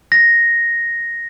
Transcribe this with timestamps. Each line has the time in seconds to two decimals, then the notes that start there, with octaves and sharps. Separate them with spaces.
0.12 A#6